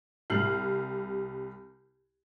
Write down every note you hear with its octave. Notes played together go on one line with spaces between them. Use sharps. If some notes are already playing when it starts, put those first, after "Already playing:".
C2 G3 F6 C7 F#7